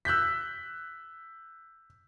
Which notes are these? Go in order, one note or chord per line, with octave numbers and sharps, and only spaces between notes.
E6 F#6 G6 B6